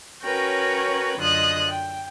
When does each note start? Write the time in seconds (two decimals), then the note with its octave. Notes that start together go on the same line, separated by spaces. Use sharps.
0.23 C#4 F#4 A#4 B4 C#5 G5
1.18 F#2 D3 F4 D#5 D#6 F#6
1.70 G5